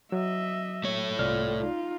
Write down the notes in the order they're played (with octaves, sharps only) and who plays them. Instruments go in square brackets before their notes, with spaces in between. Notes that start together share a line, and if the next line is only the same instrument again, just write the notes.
[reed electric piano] F#3 [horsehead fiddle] D#5 E5
[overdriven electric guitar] A3 C#5
[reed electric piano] C2 D5 F6 [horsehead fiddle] F4
[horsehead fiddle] D#4 F4